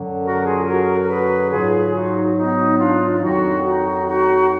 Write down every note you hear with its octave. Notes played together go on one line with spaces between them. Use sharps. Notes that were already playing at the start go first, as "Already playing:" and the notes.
Already playing: F#2 D3 F#3
F#4 A#4
F4 G#4
F#4 A#4
A#4
G#4 B4
G#2 F#3 F4 G#4
D#4 F#4
B3 D#4
D4 F4
F4
F2 D#3 F#3 D#4 F#4
D#4 F#4
D#4 F#4